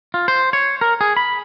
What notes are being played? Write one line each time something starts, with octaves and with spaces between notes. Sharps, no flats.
F4
C5
C#5
A#4
G#4
B5